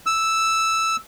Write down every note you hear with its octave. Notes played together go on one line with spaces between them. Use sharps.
E6